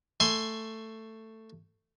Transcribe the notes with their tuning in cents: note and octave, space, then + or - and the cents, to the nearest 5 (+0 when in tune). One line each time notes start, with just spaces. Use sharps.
A3 +10 G#5 +0 C6 +0